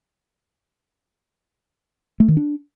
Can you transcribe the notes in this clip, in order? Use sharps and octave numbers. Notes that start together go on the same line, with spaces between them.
A3
D#3
D4